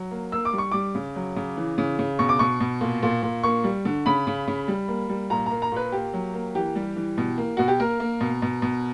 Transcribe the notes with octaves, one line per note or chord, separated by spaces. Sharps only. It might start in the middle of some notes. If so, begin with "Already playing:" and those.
Already playing: F#3
A#3
A#3 E6
D6
G3
C#6
G3 D6
C#3
F#3
C#3
E3
C#3
C#3
B2 C#6
D6
B2 C#6
B2
A#2
A#2
A#2
A#3 C#6
G3
D3
C#3 B5
C#3
C#3
G3
A#3
G3
A#2 A#5
A#3 A#5
A#5
A#2 B4
A#3 G4
F#3
A#3
E3 G4
G3
E3
B2
A#3
B2 F#4
G4
A#3 A#4
A#3
B2
B2
B2